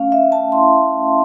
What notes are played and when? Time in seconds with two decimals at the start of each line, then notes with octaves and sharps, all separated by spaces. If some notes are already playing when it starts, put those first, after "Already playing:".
Already playing: A3 C#4 F5
0.12 E5
0.22 A3
0.32 A5
0.52 E4 C6
0.83 C#4